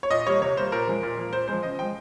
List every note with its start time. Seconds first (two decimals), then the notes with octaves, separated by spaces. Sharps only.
0.03 C#5
0.10 A#2 D#5
0.27 G3 A#3 C#5
0.41 C3 C#5
0.56 G3 A#3 C5
0.72 A#2 A#4
0.87 F3 G#3
1.03 A#2
1.18 F3 A#3
1.33 A#2 C5
1.48 F3 G#3 C5
1.63 C#3 D#5
1.79 F3 G#3 G5